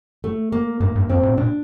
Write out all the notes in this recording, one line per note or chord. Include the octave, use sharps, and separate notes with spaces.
A3
A#3
G2 A#3
G2
F2 C4
A2
A#2 D4